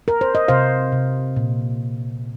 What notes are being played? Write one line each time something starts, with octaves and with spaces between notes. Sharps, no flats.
A#4
C5
D#5
C3 C5 F5
C3
A#2